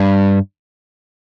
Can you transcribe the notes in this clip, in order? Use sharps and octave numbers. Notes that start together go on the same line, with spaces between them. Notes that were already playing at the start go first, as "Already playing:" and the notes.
Already playing: G2